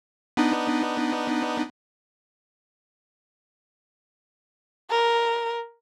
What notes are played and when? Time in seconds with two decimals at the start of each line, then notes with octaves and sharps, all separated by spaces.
0.37 B3 D4 D#4
4.91 A#4